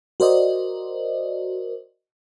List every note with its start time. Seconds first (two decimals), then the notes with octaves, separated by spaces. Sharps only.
0.20 F#4 A#4 C5 D5 D#5